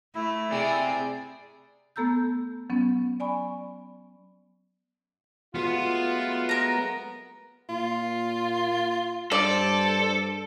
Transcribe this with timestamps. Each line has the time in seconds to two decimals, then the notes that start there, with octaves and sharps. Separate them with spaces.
0.15 A3 E4
0.52 C3 G#4 D5
1.96 A3 B3 A4 A#5 E6 G6
2.70 F#3 B3 C#4
3.20 D5 G#5 B5 C#6
5.55 F#3 G#3 A3 B3 F4
6.49 A#4 A#5
7.69 A#2 F4
9.32 G2 A4 C5 D5